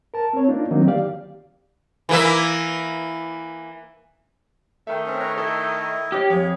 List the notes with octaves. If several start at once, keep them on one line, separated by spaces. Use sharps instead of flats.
A#4 A5
C4 C#5
A#3 D4 D#4 F4
D3 D#3 F#3 A#3 C4 D#4
G4 D5 F5
E3 A#3 E5
D#3 A3 E5 G5
C4 C#4
B4 C#5 A#5
E4 A4 D#5
G4 C#5 D6 F6
F2 G#4 C#5